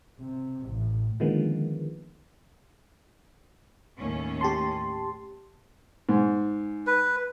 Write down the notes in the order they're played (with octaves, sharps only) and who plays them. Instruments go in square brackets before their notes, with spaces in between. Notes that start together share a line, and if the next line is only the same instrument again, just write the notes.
[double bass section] C3
A1
[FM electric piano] D3 D#3 F3 G#3 A#3 B3
[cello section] D#2 A2 C#4
[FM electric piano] G4 A5 C6
[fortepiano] G#2
[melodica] B4